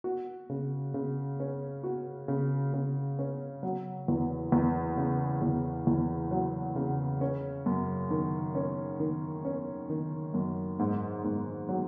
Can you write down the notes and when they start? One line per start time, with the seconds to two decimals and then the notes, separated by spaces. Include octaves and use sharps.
0.04 F#4
0.50 C#3
0.94 C#3
1.40 C#4
1.84 F#4
2.28 C#3
2.74 C#3
3.19 C#4
3.63 F#3
4.08 E2
4.52 E2
4.97 C#3
5.42 E2
5.87 E2
6.31 F#3
6.76 C#3
7.21 C#4
7.66 F#2
8.11 D#3
8.55 C#4
9.00 D#3
9.45 C#4
9.90 D#3
10.34 F#2
10.79 G#2
11.24 G#2
11.69 F#3